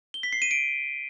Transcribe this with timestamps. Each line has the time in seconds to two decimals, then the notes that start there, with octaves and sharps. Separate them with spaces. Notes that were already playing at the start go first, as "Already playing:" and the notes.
0.14 G7
0.23 B6
0.33 C7
0.42 D#7
0.51 D7